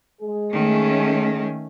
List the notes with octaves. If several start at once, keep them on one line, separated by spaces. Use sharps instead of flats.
G#3 G#4
D#3 A3 C#4